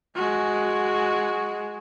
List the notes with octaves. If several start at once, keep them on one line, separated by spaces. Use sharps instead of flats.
G#3 F#4